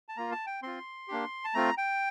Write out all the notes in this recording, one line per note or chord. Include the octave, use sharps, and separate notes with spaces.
A5
A#3 F4 A#5
A5
G5
C4 F4 C6
A#3 D4 G4
A5
A3 C4 F4 A#5
G5